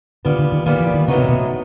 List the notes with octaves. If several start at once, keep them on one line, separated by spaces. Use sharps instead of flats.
A#2 D3 G3 B3
D3
D#3
A#2 D#3 G3 B3
E3
D#3
A2 C#3 F#3 B3 D#4 F#4
C3
B2